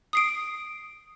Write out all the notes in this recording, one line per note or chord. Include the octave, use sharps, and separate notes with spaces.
D#6 C7 D7